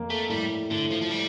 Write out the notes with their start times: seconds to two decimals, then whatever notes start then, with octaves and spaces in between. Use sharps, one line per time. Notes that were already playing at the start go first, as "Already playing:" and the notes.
Already playing: F2 A#3
0.10 A3
0.29 A2 G3
0.70 A2 D3
0.91 F3
1.01 F3
1.11 G3